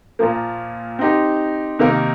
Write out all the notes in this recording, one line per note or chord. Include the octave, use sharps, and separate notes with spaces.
A#2 F3 A#3
C4 D#4 G4
C3 D#3 A#3 D#4 A#4